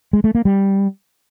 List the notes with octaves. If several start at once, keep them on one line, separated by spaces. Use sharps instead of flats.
G#3
A3
A#3
G3